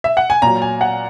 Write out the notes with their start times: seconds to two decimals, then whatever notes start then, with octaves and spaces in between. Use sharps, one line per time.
0.04 E5
0.17 F#5
0.30 G#5
0.42 A#2 F#3 A#5
0.62 G#5
0.81 F#5